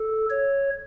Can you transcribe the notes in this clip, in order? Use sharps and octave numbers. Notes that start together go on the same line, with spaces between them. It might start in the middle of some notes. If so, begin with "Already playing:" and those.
Already playing: A4
C#5